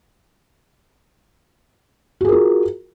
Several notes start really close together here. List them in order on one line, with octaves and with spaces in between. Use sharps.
F#4 G#4 A#4 F4